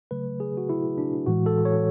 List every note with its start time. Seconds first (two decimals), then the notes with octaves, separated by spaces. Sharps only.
0.11 C#3 F#3 A3 B4
0.40 G#4
0.57 F#4
0.69 E4
0.98 D4
1.26 A2 E3 G#3 F#4
1.46 A4
1.65 C#5